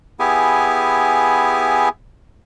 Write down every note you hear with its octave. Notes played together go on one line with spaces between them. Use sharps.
B3 E4 G4 G#4 G#5